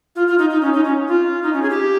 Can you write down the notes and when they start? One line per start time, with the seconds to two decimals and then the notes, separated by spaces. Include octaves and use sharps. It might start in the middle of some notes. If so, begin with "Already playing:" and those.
0.16 F4
0.27 F4
0.38 D#4
0.50 D#4
0.62 C#4
0.73 D#4
0.84 C#4
1.08 F4
1.43 D#4
1.53 C#4
1.62 G#4
1.70 G4